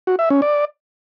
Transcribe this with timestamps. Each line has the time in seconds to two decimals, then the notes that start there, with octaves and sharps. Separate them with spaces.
0.07 F#4
0.19 E5
0.30 C#4
0.42 D5